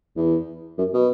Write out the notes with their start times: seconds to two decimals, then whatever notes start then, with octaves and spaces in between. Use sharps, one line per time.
0.17 E2
0.78 F#2
0.94 B2